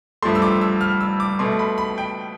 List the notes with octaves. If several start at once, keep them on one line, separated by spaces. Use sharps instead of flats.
G2 F3 A3 C6
E6
D6
E6
F6
E6
D6
B2 A3 C6
B5
B5
G5